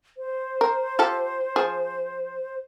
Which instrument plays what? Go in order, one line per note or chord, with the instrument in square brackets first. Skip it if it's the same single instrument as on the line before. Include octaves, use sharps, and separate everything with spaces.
[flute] C5
[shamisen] A#4
F4 G4 A4
F3 G#4